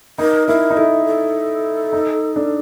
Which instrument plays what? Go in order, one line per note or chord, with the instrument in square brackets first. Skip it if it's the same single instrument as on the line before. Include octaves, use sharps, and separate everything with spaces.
[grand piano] D#4 [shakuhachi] A#4
[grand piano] E4 [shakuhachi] A#4
[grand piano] D#4
[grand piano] E4 [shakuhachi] A4
[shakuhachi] A4
[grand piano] D#4
D4